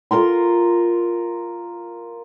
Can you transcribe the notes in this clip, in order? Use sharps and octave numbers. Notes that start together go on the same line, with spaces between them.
F4 A#4 A#5 C6